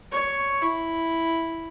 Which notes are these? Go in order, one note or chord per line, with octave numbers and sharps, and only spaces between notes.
C#5
E4